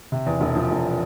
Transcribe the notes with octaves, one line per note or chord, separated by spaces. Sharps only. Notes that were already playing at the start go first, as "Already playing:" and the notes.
C3
E2
E1
F3
E1